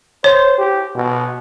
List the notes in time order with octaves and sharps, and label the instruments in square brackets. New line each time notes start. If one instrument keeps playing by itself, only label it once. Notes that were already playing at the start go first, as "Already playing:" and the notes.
[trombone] C5 [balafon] C#5
[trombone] G4
B2